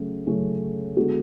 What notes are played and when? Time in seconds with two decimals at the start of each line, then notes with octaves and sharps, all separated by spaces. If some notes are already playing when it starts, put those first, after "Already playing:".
Already playing: C#3 F#3 A3 C#4
0.26 C#3 F#3 A3 C#4
0.97 D3 G#3 B3 F#4 A4